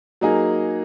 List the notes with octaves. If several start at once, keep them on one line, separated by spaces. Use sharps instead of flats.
F#3 A#3 D#4 G#4